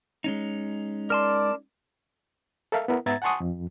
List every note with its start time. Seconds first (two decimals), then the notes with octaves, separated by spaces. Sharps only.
0.24 G#3 C#4 D#4
1.10 A#4 D5 A5 C6
2.72 A4 A#4 E5 F5
2.88 B3 E4 A#4
3.06 G#2 B3 E5 A#5 G#6 A6
3.22 F#5 G#5 A5 C6 C#6 D#6
3.40 F2